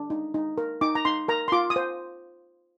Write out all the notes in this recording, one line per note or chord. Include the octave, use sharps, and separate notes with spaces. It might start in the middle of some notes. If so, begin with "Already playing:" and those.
Already playing: D4
D#4
D#4
A#4
D#4 D6
A#5
D#4 C6
A#4 A#5
C6
F4 D6
D#6
C5